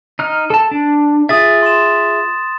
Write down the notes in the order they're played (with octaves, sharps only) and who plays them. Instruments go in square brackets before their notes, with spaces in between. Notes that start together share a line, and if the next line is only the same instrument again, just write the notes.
[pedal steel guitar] D#4 F6
A4 A5
D4
[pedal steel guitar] F4 G#4 E5 [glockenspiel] D#6 A6
[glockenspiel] C6 E7